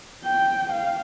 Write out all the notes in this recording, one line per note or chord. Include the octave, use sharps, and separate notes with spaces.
G5
F5